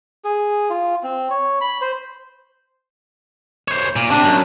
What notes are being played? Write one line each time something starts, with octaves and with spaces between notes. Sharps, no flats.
G#4
F4
C4
C#5
B5
C5
C5 C#5
A#2
C3 D4
F#2